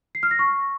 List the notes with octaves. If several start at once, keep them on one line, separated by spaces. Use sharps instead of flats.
C7
F6
A#6
C#6